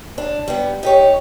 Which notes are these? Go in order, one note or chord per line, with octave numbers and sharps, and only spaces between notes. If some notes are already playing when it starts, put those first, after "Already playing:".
D4
G3 B3
D#4 G4 C#5